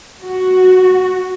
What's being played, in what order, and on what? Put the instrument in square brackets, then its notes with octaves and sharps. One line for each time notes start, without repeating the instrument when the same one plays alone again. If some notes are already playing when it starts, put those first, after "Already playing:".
[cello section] F#4